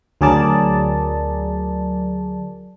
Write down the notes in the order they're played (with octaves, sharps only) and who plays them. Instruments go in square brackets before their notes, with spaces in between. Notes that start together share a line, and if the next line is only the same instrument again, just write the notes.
[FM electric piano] D2 F#3 G#4 A#4 D5 A5